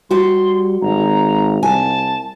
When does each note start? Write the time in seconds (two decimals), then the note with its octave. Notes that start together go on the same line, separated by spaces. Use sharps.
0.11 G3 F#4 G4 C6
0.82 G#1 A#5
1.63 C2 G#5 A5